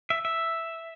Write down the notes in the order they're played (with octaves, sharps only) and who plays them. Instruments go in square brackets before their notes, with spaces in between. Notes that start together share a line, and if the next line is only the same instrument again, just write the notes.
[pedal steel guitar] E5
E5